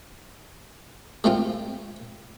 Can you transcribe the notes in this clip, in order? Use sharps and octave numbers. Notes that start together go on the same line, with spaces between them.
G#3 A3 C4 F4